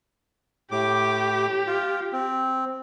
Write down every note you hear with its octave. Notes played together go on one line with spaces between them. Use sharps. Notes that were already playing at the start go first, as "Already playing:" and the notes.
A2 G4 D6
F4
C4